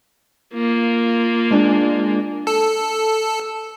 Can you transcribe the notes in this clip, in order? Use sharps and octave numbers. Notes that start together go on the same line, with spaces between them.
A#3 F4
G#3 D4
A4